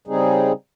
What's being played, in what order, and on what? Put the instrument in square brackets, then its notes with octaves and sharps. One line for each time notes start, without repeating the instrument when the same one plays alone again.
[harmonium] C#3 G3 C4 D#4 G#4